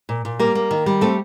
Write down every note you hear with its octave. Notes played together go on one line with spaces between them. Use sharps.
A#2
A#2
G3 A#3 A#4
A#3
D#3
G3
A3 C4 A4